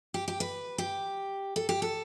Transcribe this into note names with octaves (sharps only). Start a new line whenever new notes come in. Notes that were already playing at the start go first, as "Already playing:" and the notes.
G4
G4
B4
G4
A4
G4
A4